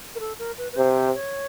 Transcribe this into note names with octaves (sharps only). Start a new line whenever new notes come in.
A#4
A4
A#4
B4
B4
C3 C5
C5
C#5